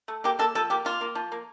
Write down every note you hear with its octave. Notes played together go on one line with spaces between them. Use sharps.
A3
A#3 G4
A#3 A4
F3 A4
A#3 G4
A#3 F4
A#3
F3
A#3